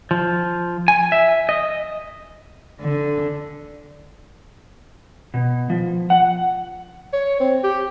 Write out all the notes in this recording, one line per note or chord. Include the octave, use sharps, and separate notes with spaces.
F3
G#5
E5
D#5
D3
B2
F3
F#5
C#5
C4
G4